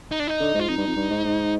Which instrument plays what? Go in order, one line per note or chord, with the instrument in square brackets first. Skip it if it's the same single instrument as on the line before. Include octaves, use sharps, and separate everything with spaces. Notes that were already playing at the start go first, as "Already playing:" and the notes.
[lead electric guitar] D#4
D4
D#4
[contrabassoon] D3
G#2
[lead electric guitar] F4
[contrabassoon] F2 [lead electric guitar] D#4
[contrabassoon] G2
F2
G2
G#2
G#2